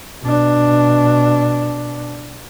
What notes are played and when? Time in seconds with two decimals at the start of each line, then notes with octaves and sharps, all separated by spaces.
0.22 B2 D4